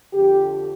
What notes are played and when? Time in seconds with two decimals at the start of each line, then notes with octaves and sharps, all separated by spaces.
0.13 F2 D3 G4